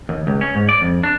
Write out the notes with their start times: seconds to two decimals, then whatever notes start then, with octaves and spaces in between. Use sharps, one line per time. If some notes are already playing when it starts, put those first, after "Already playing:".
0.09 D#2
0.27 C#2
0.41 C#4
0.55 G#2
0.69 D5
0.81 F2
1.03 D4